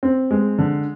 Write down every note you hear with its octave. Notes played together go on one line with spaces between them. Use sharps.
C4
G#3
D3